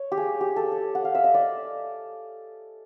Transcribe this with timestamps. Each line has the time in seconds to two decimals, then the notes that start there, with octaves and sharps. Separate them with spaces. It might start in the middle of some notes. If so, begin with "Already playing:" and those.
Already playing: C#5
0.12 G4
0.17 G#4
0.41 G4
0.56 A4
0.72 A4
0.95 F#5
1.05 F5
1.15 E5
1.24 D#5
1.34 D5